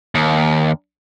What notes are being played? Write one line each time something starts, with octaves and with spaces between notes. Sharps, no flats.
D#2